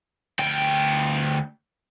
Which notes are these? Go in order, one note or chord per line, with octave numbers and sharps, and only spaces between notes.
D2 G5